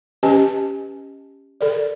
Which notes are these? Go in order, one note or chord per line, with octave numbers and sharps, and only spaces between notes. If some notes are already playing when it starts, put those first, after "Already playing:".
C#4 G4 B4 D#5 G#5 A5
A4 A#4 D5